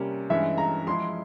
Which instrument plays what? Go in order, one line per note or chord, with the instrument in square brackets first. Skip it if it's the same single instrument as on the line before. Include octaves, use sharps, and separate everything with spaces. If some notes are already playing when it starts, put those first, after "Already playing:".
Already playing: [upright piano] C3 G3 A#3 C#4
[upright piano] G2 E3 G#3 C#4 [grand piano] E5
[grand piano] A#5
[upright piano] F3 G#3 E4 G#4 [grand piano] C6